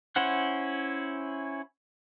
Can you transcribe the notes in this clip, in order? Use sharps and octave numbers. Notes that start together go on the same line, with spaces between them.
C#4 E4 C5 F#5 F#6